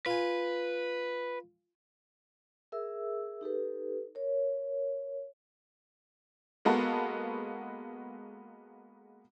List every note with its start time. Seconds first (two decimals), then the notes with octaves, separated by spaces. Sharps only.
0.06 F4 B4 G#5
2.72 G#4 A#4 E5 E6
3.41 D#4 G4 A4 B4
4.15 A#4 C#5
6.65 G#3 A#3 B3 F#4 A4